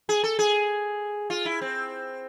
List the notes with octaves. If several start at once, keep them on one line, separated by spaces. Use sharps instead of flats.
G#4
A4
G#4
F4
E4
C4